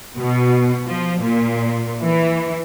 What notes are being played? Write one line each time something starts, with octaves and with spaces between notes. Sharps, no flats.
B2
F3
A#2
E3